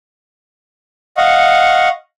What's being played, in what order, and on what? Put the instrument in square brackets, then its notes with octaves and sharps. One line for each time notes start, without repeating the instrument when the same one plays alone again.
[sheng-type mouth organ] D#5 F5 F#5 C#6